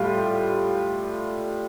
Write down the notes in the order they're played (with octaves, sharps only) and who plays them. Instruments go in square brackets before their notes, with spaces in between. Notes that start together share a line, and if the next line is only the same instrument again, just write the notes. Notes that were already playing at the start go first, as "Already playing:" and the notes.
Already playing: [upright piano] A2 G3 F4 G4